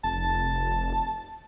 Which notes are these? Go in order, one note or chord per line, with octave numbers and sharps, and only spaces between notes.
F1 A5